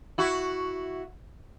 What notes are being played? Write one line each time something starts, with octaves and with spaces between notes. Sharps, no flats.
E4 F#4